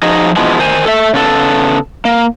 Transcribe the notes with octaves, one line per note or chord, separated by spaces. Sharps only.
F3 D#4 F#4 G#4 D#5
B2 E3 F3 G#3
D#3 C5 G#5
A4 E5
C#3 B3 A4
A#3